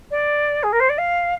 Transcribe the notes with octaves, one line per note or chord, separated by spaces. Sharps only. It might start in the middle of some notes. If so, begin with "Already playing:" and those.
D5
G#4
A#4
C5
D5
F5